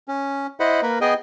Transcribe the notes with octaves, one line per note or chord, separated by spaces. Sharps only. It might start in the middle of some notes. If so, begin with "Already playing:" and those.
C#4
E4 C5 D#5 F#5 B5
A#3 A#4 B4
B3 G#4 D#5 G5 G#5